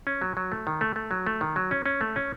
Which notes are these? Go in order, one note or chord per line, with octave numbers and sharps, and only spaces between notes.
C#4
F#3
F#3
A3
D#3
A3
A3
F#3
A3
D#3
F#3
C#4
C#4
A3
C#4